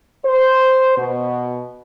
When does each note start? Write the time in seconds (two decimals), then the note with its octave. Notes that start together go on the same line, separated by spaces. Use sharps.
0.24 C5
0.97 B2